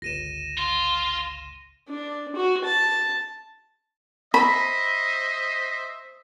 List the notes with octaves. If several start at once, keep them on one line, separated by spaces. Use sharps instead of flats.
G1 C#2 A#6 D#7 E7
F4 C6
D4
F#4
A5
C5 D#5 E5 B5